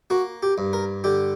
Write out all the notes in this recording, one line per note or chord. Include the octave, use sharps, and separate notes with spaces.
A#3 F#4
G4
G2
A#4
D3 G4